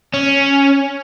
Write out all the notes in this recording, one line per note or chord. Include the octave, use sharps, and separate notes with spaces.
C#4